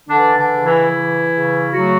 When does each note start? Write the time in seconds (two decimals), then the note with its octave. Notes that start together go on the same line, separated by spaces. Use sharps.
0.09 D3 E3 D4
0.37 D3 D4
0.51 C#3
0.64 E3 E4
0.92 E3
1.33 C#3
1.73 F#3 A3 F#4